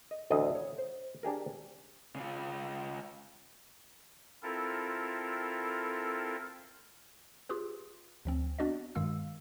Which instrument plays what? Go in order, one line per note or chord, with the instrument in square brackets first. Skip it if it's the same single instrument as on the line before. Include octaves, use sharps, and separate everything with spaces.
[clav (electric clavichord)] D#5
A1 D2 D#5 E5
C#5
C5
D4 G4 G#4 A#4
[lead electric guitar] C#3 F4
[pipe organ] C4 E4 F4 A4 A#4
[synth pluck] F4 G4 G#4 B4
D2 F3 C4
B3 D4 F#4 D5 D#5
G2 D#3 G#3 F5 E6